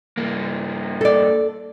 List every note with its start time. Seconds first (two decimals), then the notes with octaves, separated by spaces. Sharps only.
0.17 G2 A#3
1.01 A4 D5